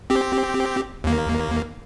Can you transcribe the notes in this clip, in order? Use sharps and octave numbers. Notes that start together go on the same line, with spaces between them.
C4 G4
D#2 A#3